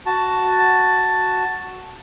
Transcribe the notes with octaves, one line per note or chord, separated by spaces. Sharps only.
F#4 A5